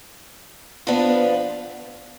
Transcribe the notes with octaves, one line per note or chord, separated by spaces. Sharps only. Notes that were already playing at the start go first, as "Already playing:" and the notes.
F3 B3 D4 F4 B4